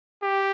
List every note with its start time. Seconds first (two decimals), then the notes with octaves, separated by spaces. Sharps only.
0.22 G4